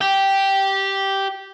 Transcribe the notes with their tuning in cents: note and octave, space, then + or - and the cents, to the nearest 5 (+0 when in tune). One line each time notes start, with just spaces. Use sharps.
G4 -5